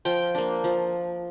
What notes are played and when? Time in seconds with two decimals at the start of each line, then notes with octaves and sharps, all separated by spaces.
0.05 F3 G5
0.35 A#3 D4
0.64 F3